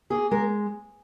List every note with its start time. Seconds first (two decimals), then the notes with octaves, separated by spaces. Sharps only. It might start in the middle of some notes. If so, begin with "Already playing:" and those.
0.10 A#3 G#4
0.31 G#3 A#4